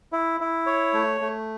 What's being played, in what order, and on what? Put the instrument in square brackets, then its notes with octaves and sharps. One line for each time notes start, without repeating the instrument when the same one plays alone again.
[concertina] E4
E4
C#5
A3
A3